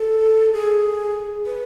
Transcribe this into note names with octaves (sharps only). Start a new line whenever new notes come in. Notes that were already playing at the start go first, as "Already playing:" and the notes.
Already playing: A4
G#4
B4